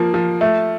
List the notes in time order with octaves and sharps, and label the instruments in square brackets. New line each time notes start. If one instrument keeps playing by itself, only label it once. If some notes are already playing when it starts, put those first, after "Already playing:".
Already playing: [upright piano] F3 A#3
F3
A3